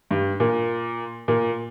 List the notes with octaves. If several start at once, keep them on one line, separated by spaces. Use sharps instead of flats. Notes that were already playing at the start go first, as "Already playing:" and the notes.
G2
A#2
A#2